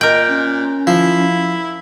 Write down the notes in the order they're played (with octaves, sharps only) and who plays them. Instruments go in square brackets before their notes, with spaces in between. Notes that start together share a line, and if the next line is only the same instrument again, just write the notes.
[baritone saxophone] A#2 [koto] A#4 G5 [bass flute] D#5
[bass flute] C#4
[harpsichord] F3 [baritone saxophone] E4